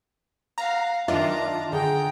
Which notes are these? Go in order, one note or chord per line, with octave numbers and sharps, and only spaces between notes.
F5 F#5 A#5
D#3 D4 D#4 F4 E5 A5 A#5
D3 G#4 G5 A#5